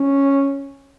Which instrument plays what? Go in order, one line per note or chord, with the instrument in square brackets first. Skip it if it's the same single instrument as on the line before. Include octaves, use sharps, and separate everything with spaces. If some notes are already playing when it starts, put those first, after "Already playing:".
Already playing: [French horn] C#4